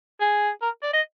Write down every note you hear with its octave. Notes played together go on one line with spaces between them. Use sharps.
G#4
A#4
D5
D#5